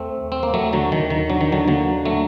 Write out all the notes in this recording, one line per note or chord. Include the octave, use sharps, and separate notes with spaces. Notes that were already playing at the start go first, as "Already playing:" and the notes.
Already playing: D#2 A3 C4
D#2
C4
A#3
D#2 F#3 A3
D3 F#3
D#2 D#3
D#3
F#3 D4
D#3
D3 F#3
D3 F#3 A#3
F#3 A3 D4